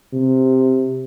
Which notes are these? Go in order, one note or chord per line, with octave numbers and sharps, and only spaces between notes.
C3